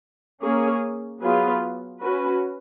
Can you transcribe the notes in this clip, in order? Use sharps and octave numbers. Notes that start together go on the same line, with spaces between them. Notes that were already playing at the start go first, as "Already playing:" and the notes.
A#3 C#4 G#4 C#5
F#3 B3 F4 G#4 B4
C#4 F#4 B4